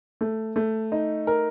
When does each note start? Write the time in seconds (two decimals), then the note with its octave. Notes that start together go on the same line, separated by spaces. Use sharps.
0.21 A3
0.56 A3
0.92 D#4
1.27 A#4